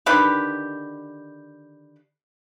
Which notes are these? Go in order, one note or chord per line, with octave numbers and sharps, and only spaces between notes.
D3 D#3 G4 B4